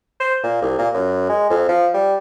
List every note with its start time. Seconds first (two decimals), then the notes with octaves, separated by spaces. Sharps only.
0.20 C5
0.44 A#2
0.62 C2
0.78 A#2
0.94 F#2
1.29 G#3
1.50 F2
1.69 F3
1.94 G3